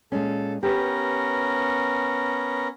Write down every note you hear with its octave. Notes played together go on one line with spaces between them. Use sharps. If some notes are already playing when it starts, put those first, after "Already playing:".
A#2 G#3 C#4 A4
B3 C#4 G4 A#4 B4